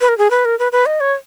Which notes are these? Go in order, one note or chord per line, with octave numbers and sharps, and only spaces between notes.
B4
A#4
G#4
B4
A#4
B4
B4
D#5
C#5